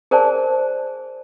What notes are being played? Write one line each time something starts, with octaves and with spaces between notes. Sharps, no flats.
G#4 A#4 C5 D5 G#5 A5